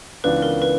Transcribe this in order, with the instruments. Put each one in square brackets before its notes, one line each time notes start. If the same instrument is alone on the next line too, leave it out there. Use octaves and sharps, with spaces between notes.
[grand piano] C#2 C#3 E3 B3 D4 [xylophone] B4
[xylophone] A#4
B4